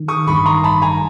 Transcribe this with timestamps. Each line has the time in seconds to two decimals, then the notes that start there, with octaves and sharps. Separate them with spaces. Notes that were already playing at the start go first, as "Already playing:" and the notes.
Already playing: D#3
0.08 C#6 D#6
0.27 A1 G2 D#3 B5 C#6
0.46 A#5 C6
0.64 A5 B5
0.82 G#5 A#5